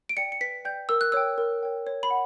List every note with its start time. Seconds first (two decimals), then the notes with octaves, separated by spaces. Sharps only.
0.09 D7
0.17 D5 G5 C#7
0.32 C#7
0.41 B4 B6
0.65 D5 G5 G6
0.89 A#4 E6
1.01 F#6
1.12 C#5 G5 E6
1.38 A#4
1.63 C#5 G5
1.87 C#5
2.03 B5
2.10 F#5